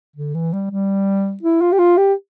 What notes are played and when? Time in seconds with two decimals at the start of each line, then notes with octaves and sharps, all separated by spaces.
0.16 D3
0.35 E3
0.53 G3
0.71 G3
1.43 E4
1.61 F4
1.72 G4
1.79 F4
1.97 G4